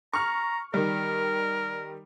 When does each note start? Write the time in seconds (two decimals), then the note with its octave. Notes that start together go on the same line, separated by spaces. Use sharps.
0.13 A#5 C#6 F6
0.74 D#3 G3 A#4